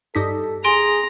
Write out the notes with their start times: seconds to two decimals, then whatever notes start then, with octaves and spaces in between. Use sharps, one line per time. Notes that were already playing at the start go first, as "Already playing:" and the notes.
0.15 G2 D#4 A4 B6
0.64 G#4 G#5 A#5 C6 D7